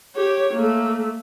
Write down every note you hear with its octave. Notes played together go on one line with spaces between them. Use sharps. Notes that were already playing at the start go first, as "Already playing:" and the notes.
G4 C#5
A3 A#3